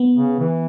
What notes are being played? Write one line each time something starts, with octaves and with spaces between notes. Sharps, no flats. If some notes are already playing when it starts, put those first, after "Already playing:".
Already playing: B3
C#3
E3